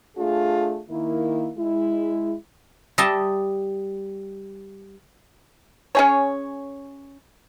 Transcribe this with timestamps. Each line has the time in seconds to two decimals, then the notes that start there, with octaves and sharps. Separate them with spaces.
0.17 A3 D4 F4 G#4
0.89 D#3 A#3 E4
1.58 G#3 E4
2.98 G3 D#5 E5 A5
5.95 C#4 G#4 C#5